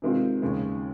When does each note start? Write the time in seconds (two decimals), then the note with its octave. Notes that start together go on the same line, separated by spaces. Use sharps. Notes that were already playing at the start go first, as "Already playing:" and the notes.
0.02 C3 D#3 G#3 C4 F4
0.42 D#2 C#3 G#3